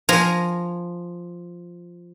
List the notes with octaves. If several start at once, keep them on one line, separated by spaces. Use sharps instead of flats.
F3 G#5 A#5